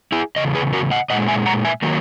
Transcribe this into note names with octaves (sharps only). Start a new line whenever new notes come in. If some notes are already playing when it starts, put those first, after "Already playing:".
E4 G#4
E2 C#3 D#5
G#4 B4
F#4 A#4
D#5 F#5
A#2 G#3 D#5 F#5
E5 G#5
F#5 A#5
E5 G#5
D#3 F#3 A#3